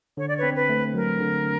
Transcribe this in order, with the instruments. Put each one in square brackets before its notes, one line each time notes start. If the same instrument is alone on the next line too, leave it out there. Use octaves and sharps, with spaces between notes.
[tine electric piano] D3 [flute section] C#5
[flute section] D5
B4 C#5
[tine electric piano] C4
[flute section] B4
[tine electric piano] A3
[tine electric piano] F#3 [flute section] A#4
[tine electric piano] D3